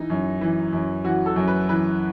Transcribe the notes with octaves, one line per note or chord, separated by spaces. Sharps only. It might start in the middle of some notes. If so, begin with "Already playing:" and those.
Already playing: E3 D#4
F#2
E3
F#2
E3 F#4
A4
F#2
B4
E3 B4